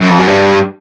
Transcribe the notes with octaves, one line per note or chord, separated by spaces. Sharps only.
F#2
F2
F#2
G2